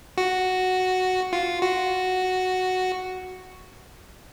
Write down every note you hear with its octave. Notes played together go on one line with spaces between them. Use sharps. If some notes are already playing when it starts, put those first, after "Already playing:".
F#4
F4
F#4